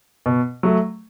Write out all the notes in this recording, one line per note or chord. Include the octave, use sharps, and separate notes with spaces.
B2
F#3 A3